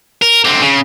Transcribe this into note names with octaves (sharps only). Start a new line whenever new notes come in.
A#4
D3 C4
C#3